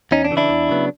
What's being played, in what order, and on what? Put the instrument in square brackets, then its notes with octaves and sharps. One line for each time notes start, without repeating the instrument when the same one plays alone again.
[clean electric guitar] E2 C#4 D#4
D4
C#3 E3
D4 E4
E2
C#3 F#3 B3